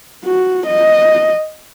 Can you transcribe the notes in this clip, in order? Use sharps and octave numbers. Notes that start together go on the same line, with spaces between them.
F#4
D#5